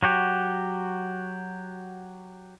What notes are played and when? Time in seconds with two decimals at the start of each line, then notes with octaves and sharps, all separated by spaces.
0.03 F#3 F#4 G4